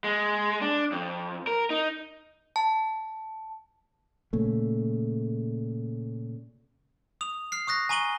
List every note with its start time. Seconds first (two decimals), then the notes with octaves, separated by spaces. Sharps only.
0.04 G#3
0.61 D4
0.92 F2
1.47 A#4
1.70 D#4
2.56 A5
4.33 A#2 C#3 A3
7.21 D#6 F7
7.52 F6 C7
7.67 C#6 D#6 F#6 A#6
7.89 G#5 A#5 C#6 D#7 F#7 G7